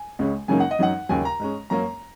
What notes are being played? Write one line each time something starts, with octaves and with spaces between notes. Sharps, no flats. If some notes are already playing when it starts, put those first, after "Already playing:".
Already playing: G#5
C#2 C#3 G#3 C#4
F#2 C#3 F#3 A#3 D#4 G#5
F#5
D#5
F#2 F#3 D#4 F#5
D#2 C#3 F#3 G#5
A#5
G#2 G#3 C#4
F#2 F#3 A#3 C#4 A#5